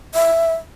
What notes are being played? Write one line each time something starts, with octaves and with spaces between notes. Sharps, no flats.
E5